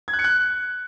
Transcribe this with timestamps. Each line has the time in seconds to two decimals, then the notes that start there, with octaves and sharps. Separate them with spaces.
0.08 G#6
0.13 F#6
0.19 C#7
0.24 F#6